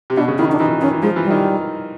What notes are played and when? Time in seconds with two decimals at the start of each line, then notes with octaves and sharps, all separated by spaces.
0.10 C3
0.16 B2 D4
0.28 C#3
0.38 D#3 E4
0.49 D#3
0.52 D4
0.59 E3 D#4
0.71 E3
0.81 D#3 C#4
0.91 E3
1.02 F3 G#3
1.16 E3
1.23 G3
1.31 D#3